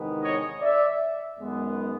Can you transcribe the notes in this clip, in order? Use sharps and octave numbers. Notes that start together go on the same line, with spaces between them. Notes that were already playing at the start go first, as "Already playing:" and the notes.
Already playing: E2 C3 D#3 G#3 B3
C#5 D#5
D5 E5
F#2 D#3 G#3 B3